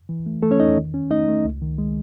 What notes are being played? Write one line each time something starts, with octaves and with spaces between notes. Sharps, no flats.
E3
A3
E3 A3 A4
C#4 C#5
E2 D#4 D#5
D#3
C#4
A3 D#4 D#5
A3
C#2
D#3
G#3